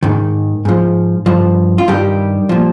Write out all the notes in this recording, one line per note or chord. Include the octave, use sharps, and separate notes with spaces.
G#2 D#3
G#2 F3
G2 F3
F4
G2 D#3 G3 G4
A#2 F3